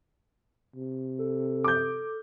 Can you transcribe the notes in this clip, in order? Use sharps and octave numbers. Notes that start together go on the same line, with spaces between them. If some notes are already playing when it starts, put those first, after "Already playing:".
C3
A4
D6 G6